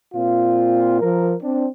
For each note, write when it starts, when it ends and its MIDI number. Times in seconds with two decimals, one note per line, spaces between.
0.15 0.98 46
0.15 0.98 60
0.15 0.98 65
1.01 1.33 53
1.01 1.33 70
1.42 1.66 60
1.42 1.66 62